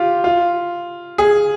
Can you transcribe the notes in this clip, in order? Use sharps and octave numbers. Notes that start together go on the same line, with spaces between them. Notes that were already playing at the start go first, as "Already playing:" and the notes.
Already playing: F4 G4
F4
G#4